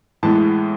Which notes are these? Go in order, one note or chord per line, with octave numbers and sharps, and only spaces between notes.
A2 E3 G#3 B3 A5